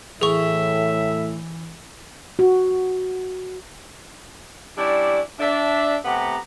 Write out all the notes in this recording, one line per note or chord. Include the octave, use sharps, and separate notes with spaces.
A2 E3 G#4 E5 C#6
F#4
G3 C#4 D4 E4 D5
D4 E5
C3 A3 B3 G4 F#5 A#5